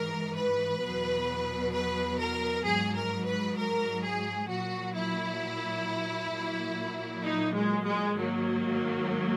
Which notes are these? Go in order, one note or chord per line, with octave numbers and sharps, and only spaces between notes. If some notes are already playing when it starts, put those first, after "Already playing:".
Already playing: G#2 E3 A#4
B4
E2 B2 F#3
B4
A#4
G#2 F#3 G#4
A#4
B4
A#4
G#4
A#2 F#3 F#4
E4
A#2 F#3
D#4
G#3
G#3
G#2 D#3 F#3 A#3